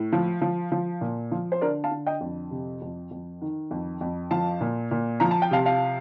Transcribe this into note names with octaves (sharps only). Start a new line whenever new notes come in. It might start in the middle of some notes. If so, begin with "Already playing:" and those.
Already playing: A2
F3
F3
F3
A#2
F3
C5
D3 A#4 D5
F5 A5
D3
D#5 G5
F2
C3
F2
F2
D#3
F2
F2
F3 F5 A5
A#2
A#2
F3 A#5
A5
G5
C3 F5 A5
F5 A5